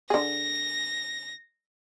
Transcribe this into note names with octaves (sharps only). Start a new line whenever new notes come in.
D3 G#4 A#6